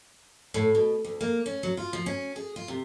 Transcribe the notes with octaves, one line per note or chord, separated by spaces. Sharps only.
A2
B2
D2
A#3
C#4
F#3
F4
F3
C#4
G#4
F4
C3